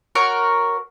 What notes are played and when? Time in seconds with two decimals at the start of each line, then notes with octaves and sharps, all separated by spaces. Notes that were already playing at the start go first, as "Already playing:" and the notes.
0.15 F#4 A#4 C#5